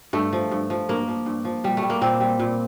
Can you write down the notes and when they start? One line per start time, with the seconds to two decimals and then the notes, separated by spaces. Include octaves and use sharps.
0.13 G2 A3
0.33 F3
0.51 G2
0.70 F3
0.89 G2 A#3
1.08 F3
1.26 G2
1.45 F3
1.64 A#2 G3
1.77 A3
1.83 G3
1.90 A#3
2.01 A#2 C4
2.20 G3
2.40 A#2